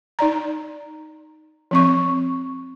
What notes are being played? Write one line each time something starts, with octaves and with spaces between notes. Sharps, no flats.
D#4 D5 A#5
F3 C4 C#6